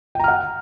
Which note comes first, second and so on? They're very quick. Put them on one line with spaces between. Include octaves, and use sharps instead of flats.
G5 A#5 F6 F#5